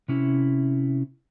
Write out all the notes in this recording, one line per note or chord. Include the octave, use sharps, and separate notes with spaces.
C3 C#4 E4